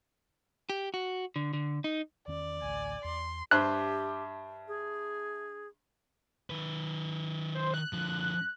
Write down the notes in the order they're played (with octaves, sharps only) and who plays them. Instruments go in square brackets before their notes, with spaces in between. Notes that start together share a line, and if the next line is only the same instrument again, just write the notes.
[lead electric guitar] G4
F#4
D3
D3
D#4
[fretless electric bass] E2 D#3 C#4 [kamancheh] D5
[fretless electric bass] A1 D2 [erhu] G#5
[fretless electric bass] E2 [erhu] C6
[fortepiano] G2 C5 [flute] G4 [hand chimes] E5 A5 [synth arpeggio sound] F#6
[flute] G#4
[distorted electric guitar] D#3 B4
[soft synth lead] C5
F#6
[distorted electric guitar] D3 F3